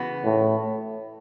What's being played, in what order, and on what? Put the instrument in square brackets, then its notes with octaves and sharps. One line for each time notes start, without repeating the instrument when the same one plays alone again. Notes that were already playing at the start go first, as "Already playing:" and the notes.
Already playing: [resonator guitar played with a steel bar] C#3 E3 B3 F#4
[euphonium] A2